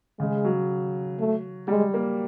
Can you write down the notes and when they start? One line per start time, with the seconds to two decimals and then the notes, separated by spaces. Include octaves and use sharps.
0.19 C#3 G#3
0.44 F#3
1.19 A3
1.68 G3 G#3
1.94 A#3